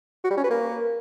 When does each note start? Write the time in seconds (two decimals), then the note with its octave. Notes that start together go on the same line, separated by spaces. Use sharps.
0.24 F#4
0.31 G3
0.37 C#4
0.44 B4
0.50 A#3